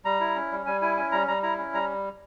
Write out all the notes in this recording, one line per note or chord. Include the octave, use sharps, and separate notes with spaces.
G3 A#5
E4
C#4
G3
G3 G#5
E4 G#5
C#4 G#5
G3 A#5
G3 A#5
E4 A#5
C#4
G3 A#5